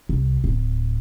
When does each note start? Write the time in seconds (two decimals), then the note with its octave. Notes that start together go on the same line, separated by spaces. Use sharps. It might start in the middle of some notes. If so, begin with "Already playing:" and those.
0.09 C2
0.44 D1